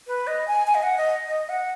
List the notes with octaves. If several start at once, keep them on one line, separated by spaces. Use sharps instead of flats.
B4
D#5
G#5
G#5
D#5
F#5
D#5
D#5
F#5